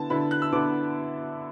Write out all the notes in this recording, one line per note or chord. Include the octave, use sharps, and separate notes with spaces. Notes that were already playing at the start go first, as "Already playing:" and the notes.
Already playing: D3 B3 E4 A5
D3 B3 E4 B5
F#6
E6
D3 B3 E4 D6